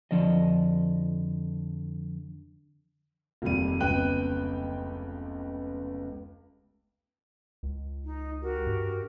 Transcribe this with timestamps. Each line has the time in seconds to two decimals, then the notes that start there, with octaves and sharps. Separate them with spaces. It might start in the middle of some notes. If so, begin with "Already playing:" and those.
0.11 F2 D3 F3 D5 D#5
3.42 F1 D#2 C3 G3 D#7
3.80 F1 C#2 B3 G5 F#6 D#7
7.63 C#2
8.05 D#4
8.41 F#4 G4 A#4
8.67 G2